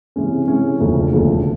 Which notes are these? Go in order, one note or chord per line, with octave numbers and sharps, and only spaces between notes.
C3 E3 G#3 C#4
C3 E3 G#3 C#4
E1 D2 C#3 F3 A3
E1 D2 C#3 F3 A3